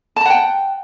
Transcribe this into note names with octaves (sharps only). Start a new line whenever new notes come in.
F#5 G5 A5 A#5